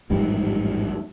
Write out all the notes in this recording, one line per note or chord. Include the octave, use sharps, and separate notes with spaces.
A1 F2 G#2 G3